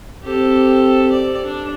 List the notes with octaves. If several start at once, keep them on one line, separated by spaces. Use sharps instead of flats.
C4 G4 A4
D5
D4